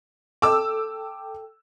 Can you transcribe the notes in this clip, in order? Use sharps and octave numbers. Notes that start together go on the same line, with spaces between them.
A4 G5 D6 E6